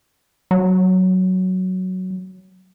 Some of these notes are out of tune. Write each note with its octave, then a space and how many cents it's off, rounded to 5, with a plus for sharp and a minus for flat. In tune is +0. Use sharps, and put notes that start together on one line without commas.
F#3 +5